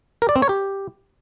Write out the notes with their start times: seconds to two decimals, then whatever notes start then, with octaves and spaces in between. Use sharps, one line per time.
0.22 A#4
0.29 D5
0.36 C4
0.42 C#5
0.49 G4